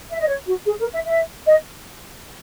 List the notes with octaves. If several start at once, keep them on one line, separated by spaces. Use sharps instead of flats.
E5
D#5
C#5
F#4
G#4
A#4
E5
E5
D#5